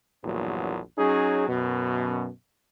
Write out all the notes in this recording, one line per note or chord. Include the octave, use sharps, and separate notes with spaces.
A#1 E2 G2 A#2 F#3
F#3 C#4 D#4 G#4
F#2 B2